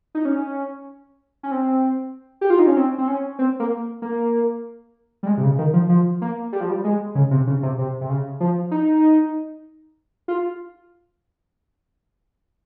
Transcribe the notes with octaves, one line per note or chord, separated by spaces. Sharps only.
D#4
C#4
C#4
C4
G4
F4
D#4
C#4
C4
C4
C#4
C4
A#3
A#3
G3
G#3
C3
C#3
D#3
F3
F3
A#3
G3
F3
G3
G#3
C#3
C3
C#3
C3
C3
C3
C#3
F3
D#4
F4